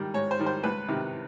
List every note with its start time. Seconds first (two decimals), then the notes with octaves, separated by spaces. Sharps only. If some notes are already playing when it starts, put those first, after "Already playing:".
Already playing: G#2 D#3 G3
0.14 G#2 C#5
0.31 C5
0.39 D#3 G3
0.46 C5
0.63 C#2 B4
0.89 C3 D#3